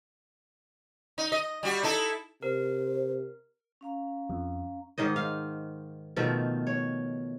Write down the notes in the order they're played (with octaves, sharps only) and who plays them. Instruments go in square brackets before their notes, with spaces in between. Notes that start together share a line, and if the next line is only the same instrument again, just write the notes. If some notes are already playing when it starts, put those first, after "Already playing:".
[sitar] D#4
D#5
G3 F#4
D#4 E4 A4
[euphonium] C3 [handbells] A#4 [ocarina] C5
[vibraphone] C#4 F5 A#5
[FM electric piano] F2
[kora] G#2 D#3 C5 D#5
F5
B2 D#3 F3 A3
C#5